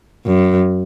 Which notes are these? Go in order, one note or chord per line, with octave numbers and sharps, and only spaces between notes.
F#2